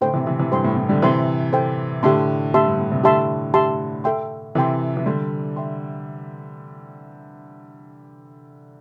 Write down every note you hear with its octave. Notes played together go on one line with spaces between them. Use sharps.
A2 D3 A4 C5 G5 C6
C3 E3
C3 E3
C3 E3
G2 A4 C5 G5 C6
A2
A2
D3 G3
C3 E3 A4 C5 G5 C6
A4 C5 G5 C6
A2 D3 G4 E5 A5 C6
A2 G4 E5 A5 C6
G2
A2
G2 C3
A2 D3 G4 E5 A5 C6
G4 E5 A5 C6
A4 E5 G5 C6
C3 E3 A4 E5 G5 C6
E3
D3 G3 A4 E5 G5 C6
E5 G5 C6